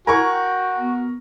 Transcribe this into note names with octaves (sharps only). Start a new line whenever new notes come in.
F#4 A#4 G#5 C#6
G5
B3